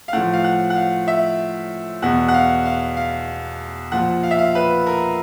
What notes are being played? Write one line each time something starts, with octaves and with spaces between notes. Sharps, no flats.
F5
A2 F3 F#5
F5
F#5
F#5
F5
E5
E2 B2 F#5
F#5
F5
F5
F5
A#2 F3 F#5
F5
E5
F5
B4
A#4